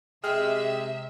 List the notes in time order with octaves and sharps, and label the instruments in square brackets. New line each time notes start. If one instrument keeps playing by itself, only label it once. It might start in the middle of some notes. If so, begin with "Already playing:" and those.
[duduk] C3 [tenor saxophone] G#3 [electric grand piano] G#4 G5 F6 [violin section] E5